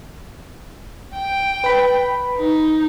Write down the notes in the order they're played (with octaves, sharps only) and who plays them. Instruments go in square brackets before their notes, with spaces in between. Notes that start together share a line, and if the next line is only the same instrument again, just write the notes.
[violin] G5
[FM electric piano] B4 B5
[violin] D#4